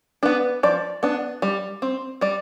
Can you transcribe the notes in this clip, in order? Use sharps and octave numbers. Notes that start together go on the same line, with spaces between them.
B3 D4 B4
F3 D5
B3 D4
G3
C4
G3 D5